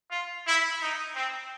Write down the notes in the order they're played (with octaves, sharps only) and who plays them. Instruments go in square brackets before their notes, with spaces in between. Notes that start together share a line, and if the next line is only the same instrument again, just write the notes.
[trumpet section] F4
E4
D#4
C4